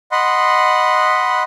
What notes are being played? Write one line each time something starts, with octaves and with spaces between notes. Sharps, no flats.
D#5 F#5 B5 C6